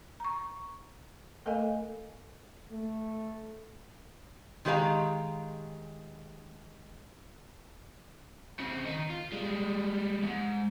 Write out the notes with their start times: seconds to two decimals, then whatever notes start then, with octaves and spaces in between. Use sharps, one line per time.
0.20 A#5 C#6
1.46 A3 A4 A#4 D#5 F5 G#5
2.72 A3
4.65 D#3 G#3 G4 B4 F5 A#5
8.59 C#3 C4
8.85 D#3 D#4
9.10 F4
9.32 G3 G#3
10.23 E2 G#2